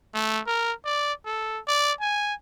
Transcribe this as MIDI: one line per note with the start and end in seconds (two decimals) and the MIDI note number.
0.15 0.41 57
0.47 0.73 70
0.86 1.13 74
1.26 1.60 69
1.68 1.93 74
2.01 2.34 80